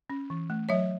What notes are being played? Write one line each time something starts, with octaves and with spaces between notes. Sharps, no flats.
C#4
E3
A3
F#3 C#5 E5